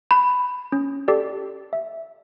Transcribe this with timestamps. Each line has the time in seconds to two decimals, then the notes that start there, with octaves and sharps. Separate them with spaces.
0.11 B5
0.72 C#4
1.08 G4 A4 D5
1.73 E5